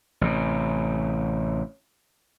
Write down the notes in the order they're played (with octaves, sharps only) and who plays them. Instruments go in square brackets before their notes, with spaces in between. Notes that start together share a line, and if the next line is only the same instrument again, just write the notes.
[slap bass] A1 C3